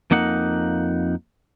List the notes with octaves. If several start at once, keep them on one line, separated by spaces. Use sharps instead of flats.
F2 A#3 D#4 F#5